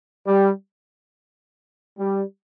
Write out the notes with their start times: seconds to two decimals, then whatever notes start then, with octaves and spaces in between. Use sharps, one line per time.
0.26 G3
1.99 G3